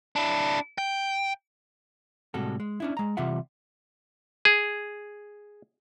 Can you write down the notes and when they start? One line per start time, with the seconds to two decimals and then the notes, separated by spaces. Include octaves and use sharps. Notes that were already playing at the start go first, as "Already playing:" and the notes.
0.16 D4 E4
0.78 G5
2.34 A2 C3 G3 G#3 F#4 A4
2.60 G#3
2.80 C#4 D4 E4
2.97 G#3 A#5
3.17 C3 E3 G3 F4 E5 F#5
4.45 G#4